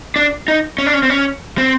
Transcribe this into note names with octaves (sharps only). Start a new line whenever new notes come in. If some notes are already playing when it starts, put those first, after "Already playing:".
D4
D#4
C#4
D4
C#4
C4
C#4
C4